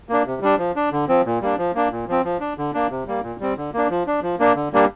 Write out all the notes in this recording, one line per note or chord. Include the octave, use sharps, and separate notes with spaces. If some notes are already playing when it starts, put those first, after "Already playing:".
A#3 D4
C3
G3 D4
F3
D4
D3
F3 C4
A#2
G3 A#3 D4
F3
A#3 D4
A#2
F3 C4
F3
D4
D3
A#3 D4
C3
G3 A#3
A#2
G3 C4
D3
A#3 D4
F3
D4
F3
A#3 D4
D3
G3 A#3 D4